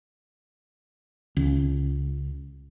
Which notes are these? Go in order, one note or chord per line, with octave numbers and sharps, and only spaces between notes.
C#2